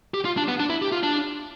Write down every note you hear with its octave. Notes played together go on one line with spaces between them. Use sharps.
G4
F4
D4
B3
D4
E4
G4
F4
D4